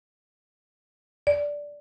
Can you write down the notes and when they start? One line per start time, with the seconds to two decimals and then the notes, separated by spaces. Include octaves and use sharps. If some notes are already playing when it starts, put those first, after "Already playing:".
1.27 D5